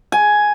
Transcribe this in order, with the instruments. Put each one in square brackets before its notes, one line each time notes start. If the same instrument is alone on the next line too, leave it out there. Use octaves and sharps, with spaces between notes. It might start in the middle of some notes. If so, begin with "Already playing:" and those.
[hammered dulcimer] G#5